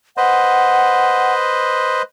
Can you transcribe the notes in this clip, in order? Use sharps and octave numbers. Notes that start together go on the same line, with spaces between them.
B4 C5 D#5 F#5